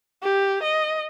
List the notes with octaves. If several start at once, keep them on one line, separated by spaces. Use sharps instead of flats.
G4
D#5